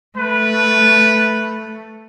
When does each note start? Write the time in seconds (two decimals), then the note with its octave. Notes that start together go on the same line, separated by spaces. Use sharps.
0.17 A3 B4